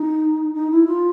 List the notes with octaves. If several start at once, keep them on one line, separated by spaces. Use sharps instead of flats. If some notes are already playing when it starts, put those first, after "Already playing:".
Already playing: D#4
D#4
E4
F4